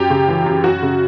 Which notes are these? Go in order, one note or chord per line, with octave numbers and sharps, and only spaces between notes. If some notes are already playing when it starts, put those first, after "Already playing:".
Already playing: F#2 G4
C#3
E3
F#2
F#2 F#4
C#3